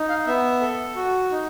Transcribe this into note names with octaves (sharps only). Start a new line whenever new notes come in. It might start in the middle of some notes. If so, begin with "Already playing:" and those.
Already playing: D#4
F5
B3 E5
A4
F#4
D#4